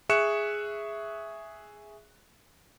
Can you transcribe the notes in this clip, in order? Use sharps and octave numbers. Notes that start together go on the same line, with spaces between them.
G#4 E5 C#6 F#6 C#7 E7